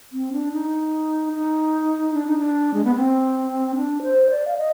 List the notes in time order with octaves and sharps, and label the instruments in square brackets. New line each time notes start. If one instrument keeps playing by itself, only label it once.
[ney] C4
D4
D#4
D#4
D4
D#4
D4
G#3
B3
C4
D4
C5
D5
F5
D#5